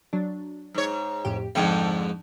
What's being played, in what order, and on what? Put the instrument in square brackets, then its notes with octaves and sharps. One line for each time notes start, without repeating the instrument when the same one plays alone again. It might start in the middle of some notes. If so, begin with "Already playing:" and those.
[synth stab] F#3 D4
[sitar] G#2 C#5
[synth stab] F2 A2 G4
[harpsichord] F2 G#2 [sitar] D3 [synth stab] G5